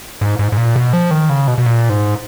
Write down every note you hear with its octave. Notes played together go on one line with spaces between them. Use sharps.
G#2
G#2
G#2
A#2
B2
F3
D#3
C#3
B2
B2
A#2
G#2